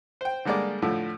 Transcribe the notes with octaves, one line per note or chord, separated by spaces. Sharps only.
C5 G5
D3 G3 G#3 A#3 D5
A2 D3 F3 A3